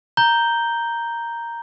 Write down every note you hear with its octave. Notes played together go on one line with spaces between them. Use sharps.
A#5 G6 G7